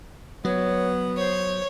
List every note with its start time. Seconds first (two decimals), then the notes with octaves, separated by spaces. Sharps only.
0.45 F#3 B3 C#5
1.17 C5 C#5